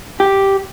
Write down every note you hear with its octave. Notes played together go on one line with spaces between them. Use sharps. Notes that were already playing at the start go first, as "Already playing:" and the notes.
G4